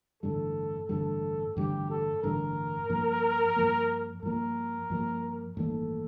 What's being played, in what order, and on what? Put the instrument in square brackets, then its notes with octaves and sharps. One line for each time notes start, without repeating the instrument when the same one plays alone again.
[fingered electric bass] A1 G2 D3 G3 [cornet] A4
[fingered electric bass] A1 G2 D3 G3 [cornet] A4
[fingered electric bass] A1 G2 D3 G3 [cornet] G4
[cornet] A4
[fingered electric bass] A1 G2 D3 G3 [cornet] A#4
[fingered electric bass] G2 F3 A#3
G2 F3 A#3
[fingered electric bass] G2 F3 A#3 [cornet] A#4
[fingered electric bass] G2 F3 A#3
[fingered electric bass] A1 G2 D#3 A#3 [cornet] A4